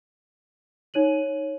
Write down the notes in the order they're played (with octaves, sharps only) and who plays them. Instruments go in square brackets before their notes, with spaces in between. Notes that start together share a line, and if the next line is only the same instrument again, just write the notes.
[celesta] D#4 C#5 D#7 F#7